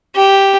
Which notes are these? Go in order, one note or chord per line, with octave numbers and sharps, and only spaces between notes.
G4